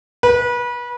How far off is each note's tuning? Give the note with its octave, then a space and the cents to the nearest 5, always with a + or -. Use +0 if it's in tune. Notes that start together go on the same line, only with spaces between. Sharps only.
B4 -30